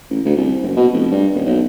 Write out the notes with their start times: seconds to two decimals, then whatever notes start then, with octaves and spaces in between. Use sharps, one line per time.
0.10 A1
0.25 D2
0.37 C2
0.63 F#1
0.76 B2
0.92 F1
1.12 G2
1.34 D#1
1.46 B1